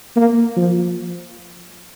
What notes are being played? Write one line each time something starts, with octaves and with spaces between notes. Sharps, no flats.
A#3
F3